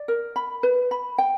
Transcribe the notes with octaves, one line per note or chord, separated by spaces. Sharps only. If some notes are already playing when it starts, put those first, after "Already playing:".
Already playing: D5
A#4
B5
B4
B5
G5